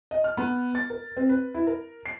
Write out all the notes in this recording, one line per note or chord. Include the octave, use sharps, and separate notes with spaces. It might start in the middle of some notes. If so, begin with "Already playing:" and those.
D#5
F6
B3
A6
A#4
C4
B4
E4
A#4
C7